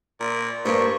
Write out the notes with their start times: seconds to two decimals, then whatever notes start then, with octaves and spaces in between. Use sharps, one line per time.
0.20 A#2
0.65 G2 A#3 C5 C#6